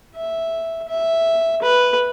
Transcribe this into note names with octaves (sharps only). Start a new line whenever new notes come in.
E5
E5
B4